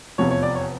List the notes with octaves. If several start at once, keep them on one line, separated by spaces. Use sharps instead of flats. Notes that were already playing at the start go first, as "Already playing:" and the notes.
F1 E2 C3 F3 C#5
C#5
D5
C#5